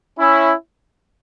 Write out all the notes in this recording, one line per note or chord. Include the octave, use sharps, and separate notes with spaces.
C#4 E4